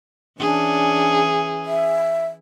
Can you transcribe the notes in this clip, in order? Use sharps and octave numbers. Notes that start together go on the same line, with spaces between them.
E3 C#4 D4 G#4
E5